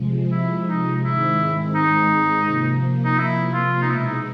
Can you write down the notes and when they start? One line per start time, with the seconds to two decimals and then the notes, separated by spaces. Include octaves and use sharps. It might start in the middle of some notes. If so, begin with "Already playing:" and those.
Already playing: C3 F3 G#3
0.31 E4
0.68 D#4
1.03 G#2 D#3 G#3 C4 E4
1.75 D#4
2.46 C3 F3 A#3
3.05 D#4
3.18 E4
3.53 F4
3.82 D#4
3.90 B2 G#3 B3 E4
4.07 D#4